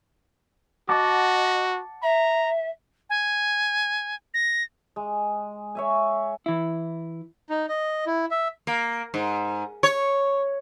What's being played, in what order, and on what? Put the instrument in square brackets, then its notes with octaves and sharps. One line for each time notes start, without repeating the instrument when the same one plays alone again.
[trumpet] F#4 [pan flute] D#5 [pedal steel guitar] F#5 A5 D6
[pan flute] E5 [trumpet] A#5
[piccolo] G#5
A#6
[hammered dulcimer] G#3
C#5 E5 G#5
[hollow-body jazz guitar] E3 E4
[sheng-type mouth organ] D#4
D#5
E4
E5
[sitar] A#3
G#2
C#5